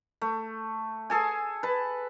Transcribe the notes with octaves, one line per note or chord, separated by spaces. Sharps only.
A3
G#4 A4 G#5
B4 A5